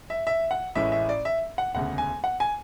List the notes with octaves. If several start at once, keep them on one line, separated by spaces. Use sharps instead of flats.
E5
E5
F#5
A1 A2 G#3 C#4 E4 E5
E5
D5
E5
F#5
E1 D2 C#3 F#5
G#5
F#5
G#5